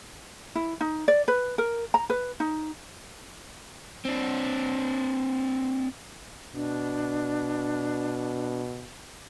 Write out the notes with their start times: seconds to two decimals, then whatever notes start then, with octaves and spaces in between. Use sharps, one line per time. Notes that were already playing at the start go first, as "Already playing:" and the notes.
0.55 E4
0.81 D#4
1.08 D5
1.28 B4
1.58 A#4
1.94 A#5
2.10 B4
2.40 D#4
4.05 C4 D4
6.54 B2 D4